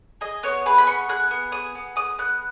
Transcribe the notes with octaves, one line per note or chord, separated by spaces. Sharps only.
G#4 D#5
B3 C#5
G#4 B4
B5
B3 C#6
G#4 F#6
B3
G#4 D#6
B3
G#4 D#6
B3 F#6